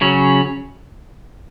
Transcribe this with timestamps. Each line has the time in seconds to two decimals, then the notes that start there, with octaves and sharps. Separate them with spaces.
0.01 C#3 F#3 C#4